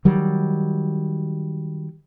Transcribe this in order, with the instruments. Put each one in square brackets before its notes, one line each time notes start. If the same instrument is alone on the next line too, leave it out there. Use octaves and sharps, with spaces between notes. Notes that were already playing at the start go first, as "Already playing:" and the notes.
[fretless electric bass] D#3 F#3 G3